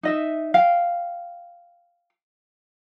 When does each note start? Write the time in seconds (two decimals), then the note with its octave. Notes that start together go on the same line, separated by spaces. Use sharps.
0.03 D#4 D#5 E5
0.54 F5 G5